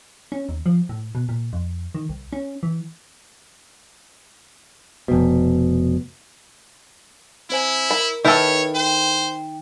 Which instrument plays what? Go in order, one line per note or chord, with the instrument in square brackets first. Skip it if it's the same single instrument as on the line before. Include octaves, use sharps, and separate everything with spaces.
[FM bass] C#4
D#2
F3
A2
B2
A#2
F2
D#3
C2
C#4
E3
[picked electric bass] F1 B2
[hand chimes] C4 C5 G#5 [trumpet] E4
[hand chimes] A#4 [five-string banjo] B5
[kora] D#3 [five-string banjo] E4 A4 [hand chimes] B4 [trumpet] C#5
[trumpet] C5 [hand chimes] G5